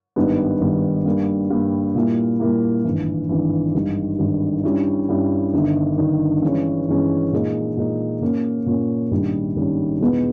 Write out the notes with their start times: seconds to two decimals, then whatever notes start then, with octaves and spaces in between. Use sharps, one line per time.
0.16 G#1 G2 D#3 G3 B3
0.61 G#1 G2 D#3 G3 B3
1.05 G2 G3 A#3
1.50 G2 G3 A#3
1.95 A#2 G3 A#3 E4
2.40 A#2 G3 A#3 E4
2.84 G#1 G2 E3
3.29 G#1 G2 E3
3.74 G#1 G2 D#3 G3
4.19 G#1 G2 D#3 G3
4.64 G2 G3 C#4 E4
5.09 G2 G3 C#4 E4
5.53 G1 G2 D#3
5.98 G1 G2 D#3
6.42 G2 E3 G#3 C#4
6.87 G2 E3 G#3 C#4
7.32 A#2 G#3 D#4
7.77 A#2 G#3 D#4
8.21 A#2 A#3 C#4
8.66 A#2 A#3 C#4
9.11 A#1 G#2 D#3 G3 C#4
9.56 A#1 G#2 D#3 G3 C#4
10.01 E2 B2 G#3 B3